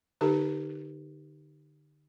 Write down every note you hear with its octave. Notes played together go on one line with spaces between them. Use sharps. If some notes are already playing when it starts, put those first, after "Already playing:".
D3 D#4 G4 A4 B4